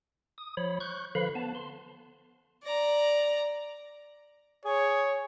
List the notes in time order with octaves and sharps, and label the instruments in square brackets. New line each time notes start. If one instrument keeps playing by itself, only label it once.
[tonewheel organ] D#6
F3 C#5 B5
C#6 F#6 G6
D3 F3 B4 F5 B5
B3 A5
C6
[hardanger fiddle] D5 A#5
[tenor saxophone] G#4 [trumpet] C#5